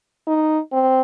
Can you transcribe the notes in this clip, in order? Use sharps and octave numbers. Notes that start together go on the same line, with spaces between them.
D#4
C4